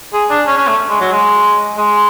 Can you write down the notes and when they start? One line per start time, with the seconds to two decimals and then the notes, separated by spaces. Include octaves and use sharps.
0.13 G#4
0.30 D4
0.47 C#4
0.57 C#4
0.68 A3
0.89 G#3
1.01 F#3
1.12 G#3
1.77 G#3